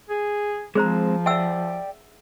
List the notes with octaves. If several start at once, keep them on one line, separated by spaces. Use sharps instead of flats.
G#4
F3 G#3 C4 G#4 C5 A#5
D5 E5 F#5 G5 E6